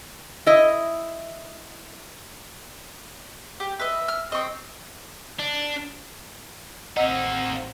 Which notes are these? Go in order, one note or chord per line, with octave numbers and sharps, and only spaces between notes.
E4 D#5
G4
B4 D#5 E5
F6
C4 D#5 C#6
D4
A1 A#3 C4 D#4 D#5 F#5 E6 B6